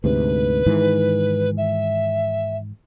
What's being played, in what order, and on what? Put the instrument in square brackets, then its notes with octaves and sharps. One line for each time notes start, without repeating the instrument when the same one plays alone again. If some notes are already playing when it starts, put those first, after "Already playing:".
[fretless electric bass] D2 G#2 C3 [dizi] B4
[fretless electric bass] G#2 D#3 E3
[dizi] E5